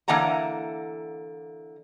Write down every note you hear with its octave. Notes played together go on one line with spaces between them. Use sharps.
D3 E3 A#3 F#5 A5 A#5